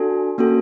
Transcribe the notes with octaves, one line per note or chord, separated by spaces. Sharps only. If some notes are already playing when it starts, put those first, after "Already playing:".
Already playing: D4 F#4 A4 G#5
A#3 C#4 F#4 A4